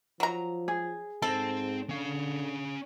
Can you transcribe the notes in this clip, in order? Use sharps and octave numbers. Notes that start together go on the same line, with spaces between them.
F3 F#3 A#5
G#4
G#2 C4 A4
D3 C#4 F5